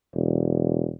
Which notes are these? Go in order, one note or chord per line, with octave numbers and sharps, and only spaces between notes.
E1